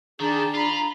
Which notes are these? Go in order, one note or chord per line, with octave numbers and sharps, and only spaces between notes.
D#3 D4 G4 G#4 A5 A#5
F4 A#5 B5